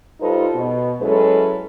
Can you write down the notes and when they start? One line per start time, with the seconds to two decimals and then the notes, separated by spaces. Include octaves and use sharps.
0.21 G3 D#4 F4 A4 B4 C5
0.54 B2
1.01 F#3 G#3 C#4 E4 A4 B4